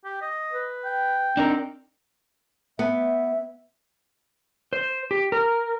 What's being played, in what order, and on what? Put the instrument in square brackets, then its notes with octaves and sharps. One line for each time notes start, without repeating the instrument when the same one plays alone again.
[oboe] G4
D#5
[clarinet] B4
[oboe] G5
[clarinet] C4 [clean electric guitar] D4 D#4 A#4
[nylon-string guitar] B3 [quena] E5
[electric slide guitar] C5
G4
A#4